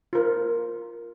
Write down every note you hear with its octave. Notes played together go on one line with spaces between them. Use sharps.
F4 A#4